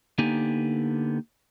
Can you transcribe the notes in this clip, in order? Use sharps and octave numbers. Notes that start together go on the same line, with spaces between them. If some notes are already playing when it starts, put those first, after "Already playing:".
D3 A#3 B3 D#4 G4 G#5